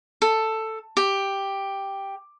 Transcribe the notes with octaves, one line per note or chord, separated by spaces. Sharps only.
A4
G4